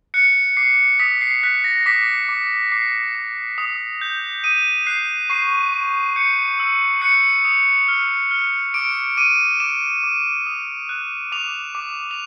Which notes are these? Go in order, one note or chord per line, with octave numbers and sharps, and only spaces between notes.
F#6 C#7
D6 C7
D#6 B6
C7
F#6 B6
A#6
D6 B6
D6
D6 C7
D6
D#6
G6
D#6 D#7
F#6 C7
C#6 C7
C#6
G6 C#7
E6
F#6 C#7
D#6
F6
F6
D6 D7
D6 D#7
D6 E7
D6
D#6
F#6
D6 F7
D6
F7